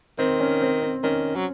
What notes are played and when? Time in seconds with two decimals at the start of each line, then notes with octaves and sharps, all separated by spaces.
0.19 D#3 C4
0.40 C#4
0.62 C4
0.82 C4
1.03 D#3 C#4
1.36 F#3